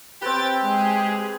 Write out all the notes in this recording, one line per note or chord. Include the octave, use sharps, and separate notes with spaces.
C4 G4 B4 G5 A6
G#3 G#4